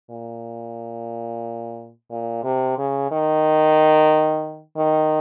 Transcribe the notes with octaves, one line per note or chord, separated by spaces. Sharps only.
A#2
A#2
C3
C#3
D#3
D#3